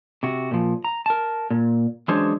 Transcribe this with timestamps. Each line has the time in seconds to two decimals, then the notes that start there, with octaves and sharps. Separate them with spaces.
0.23 C3 F#4
0.51 A#2 F3
0.84 A#5
1.06 A#4 A5
1.50 A#2
2.08 E3 F#3 G#3 C#4 D4 C5